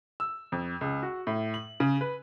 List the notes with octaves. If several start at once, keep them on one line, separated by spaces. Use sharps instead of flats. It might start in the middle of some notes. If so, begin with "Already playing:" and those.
E6
F2
C#2
F#4
A2
F#7
C#3
B4